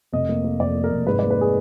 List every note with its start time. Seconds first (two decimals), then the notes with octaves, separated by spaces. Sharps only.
0.13 F1 D#5
0.29 A#3
0.44 A#3
0.59 F2 D5
0.75 A#3
0.84 A#4
0.91 F1
1.07 G#2 B4
1.19 D5
1.23 A#3
1.31 B4
1.41 G#4